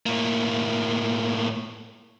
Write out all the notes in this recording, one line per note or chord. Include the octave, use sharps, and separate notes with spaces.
A2 A#3